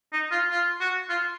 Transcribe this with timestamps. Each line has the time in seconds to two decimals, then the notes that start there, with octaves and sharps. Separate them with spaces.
0.13 D#4
0.31 F4
0.51 F4
0.80 F#4
1.09 F4